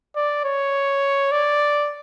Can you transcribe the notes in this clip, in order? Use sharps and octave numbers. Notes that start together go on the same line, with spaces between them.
D5
C#5
D5